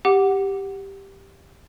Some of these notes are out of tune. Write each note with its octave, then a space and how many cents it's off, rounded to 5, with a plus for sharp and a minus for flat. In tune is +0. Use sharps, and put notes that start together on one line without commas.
G4 +0 F#5 +0 D6 +0